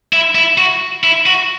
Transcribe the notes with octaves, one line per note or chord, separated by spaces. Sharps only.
E4
E4
F#4
E4
F#4